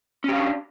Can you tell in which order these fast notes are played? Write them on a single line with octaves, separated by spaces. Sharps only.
C#4 G4 F5 D4